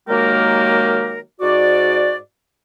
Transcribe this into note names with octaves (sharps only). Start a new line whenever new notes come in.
D#3 F#3 G#3 A#3 G4 A#4
G#2 F#4 D5